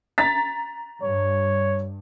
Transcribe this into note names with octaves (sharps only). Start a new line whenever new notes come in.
A#5 A6 B6
G2 C#5